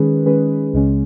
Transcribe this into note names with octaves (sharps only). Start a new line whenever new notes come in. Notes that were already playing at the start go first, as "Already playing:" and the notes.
Already playing: D#3 G#3 C#4 G#4 B4
D#3 G#3 C#4 G#4 B4
C#2 C#3 G#3 C#4